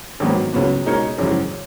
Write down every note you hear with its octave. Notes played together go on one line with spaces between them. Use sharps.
G#1 G#2 D#3 F#3 B3
C#2 C#3 F#3 B3 F#4
B2 G#3 D#4 A#4 C#5
G#1 F#2 C#3 E3 G#3